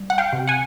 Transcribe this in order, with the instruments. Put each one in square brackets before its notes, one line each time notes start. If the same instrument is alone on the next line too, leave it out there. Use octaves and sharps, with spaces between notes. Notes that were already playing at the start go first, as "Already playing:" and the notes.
Already playing: [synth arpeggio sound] G3
F#5
F5 G5
C3
F#5 G#5